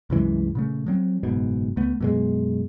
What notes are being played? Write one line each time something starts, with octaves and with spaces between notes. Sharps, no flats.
C2 F#2 E3 G#3
A#2 C#3 A3
F3 F#3 C4
F#1 G#2 B2
C#2 A3 B3
F#2 B2 G#3